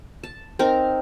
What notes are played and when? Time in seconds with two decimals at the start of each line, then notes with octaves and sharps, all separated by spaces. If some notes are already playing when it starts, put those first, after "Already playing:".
0.24 A5
0.59 C4 D#4 A#4